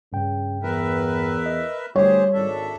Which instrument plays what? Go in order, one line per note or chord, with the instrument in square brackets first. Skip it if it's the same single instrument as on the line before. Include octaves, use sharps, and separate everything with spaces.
[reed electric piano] G2 G5 [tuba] C#3
[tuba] E2 [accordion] A#4 B4 E5
[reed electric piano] D#5
[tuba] D2 [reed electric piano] G3 [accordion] G4 G#4 C5 [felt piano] C#5
[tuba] G#1 [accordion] D4 A4 E5